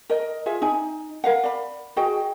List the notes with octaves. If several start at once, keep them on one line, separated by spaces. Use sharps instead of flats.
A#4 D#5
F4 G#4 E5
D#4 G#5
A#4 F5 F#5
D5 B5
F#4 G#4 D#5 G5